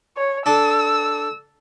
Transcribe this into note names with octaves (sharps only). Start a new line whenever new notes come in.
C#5
D4 A4 E6